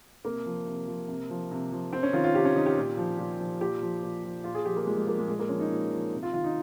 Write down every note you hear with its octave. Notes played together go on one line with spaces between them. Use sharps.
C3 A#3
F3
C3
F3
C3
F3
C3
F3
C3 C4
C#4
D#3 F4
F4
C3 G4
C#4
D#3 D#4
G4
A#2
F3
A#2
F3
A#2 G4
F3
A#2
F3
A#2 F4
G#4
F3 G4
A#3
A#2 G#3
G#3
F3 A#3
G#3
A#2 G#3
A#3
F3 C#4
D#4
A#2
F3
C3
F4
D#3 F4
D#4